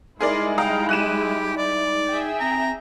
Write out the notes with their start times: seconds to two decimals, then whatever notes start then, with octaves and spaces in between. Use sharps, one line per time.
0.21 G3 G#3 D#4 E4 G#4 A#4 D5 C6
0.58 F5 G5 A#5 D#6
0.89 G4 F#6 D#7 E7
1.57 D5
2.09 G#4 E5 G5
2.40 C4 A#5